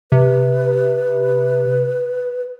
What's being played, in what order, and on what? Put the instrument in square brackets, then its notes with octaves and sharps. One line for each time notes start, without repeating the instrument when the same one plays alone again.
[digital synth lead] C3 [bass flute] B4